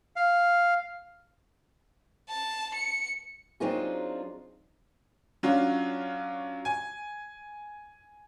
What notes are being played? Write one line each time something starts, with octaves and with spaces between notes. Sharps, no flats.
F5
A5
C#7
F#3 C4 D4 D#4 F4 G#4
F#3 C#4 D4 F4 F#4
G#5